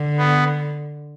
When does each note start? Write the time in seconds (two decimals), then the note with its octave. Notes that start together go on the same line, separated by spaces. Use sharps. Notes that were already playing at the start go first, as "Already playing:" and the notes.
Already playing: D3
0.18 B3